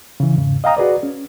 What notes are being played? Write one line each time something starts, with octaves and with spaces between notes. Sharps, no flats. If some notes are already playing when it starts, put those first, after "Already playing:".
C#3 E3
E2 G#2 C#3
D#5 F5 G5 A#5 D#6
F#4 G#4 B4 D5
C#4